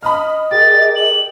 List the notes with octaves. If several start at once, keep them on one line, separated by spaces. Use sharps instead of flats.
D#5 B5 D#6 F6
G4 G#4 A#4 D6 A6
F#7